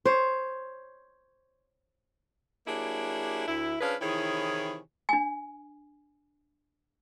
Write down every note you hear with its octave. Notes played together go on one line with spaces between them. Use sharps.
C5 C#5
F#3 A#3 D4 E4 G4 G#4
D2 E4
F3 C#4 D4 G#4 B4 F5
C3 D#3 E3 E4 G#4 C#5
D4 G#5